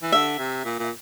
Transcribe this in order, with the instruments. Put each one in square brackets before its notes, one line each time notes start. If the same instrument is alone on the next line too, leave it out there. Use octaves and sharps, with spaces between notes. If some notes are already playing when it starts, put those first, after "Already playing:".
[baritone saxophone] E3
[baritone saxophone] D3 [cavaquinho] E5
[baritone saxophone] C3
A#2
A#2